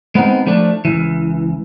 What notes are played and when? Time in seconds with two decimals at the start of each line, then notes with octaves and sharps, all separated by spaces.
0.15 G#3 B3 C4 D#4
0.47 F3 A3 D4
0.85 C#2 E3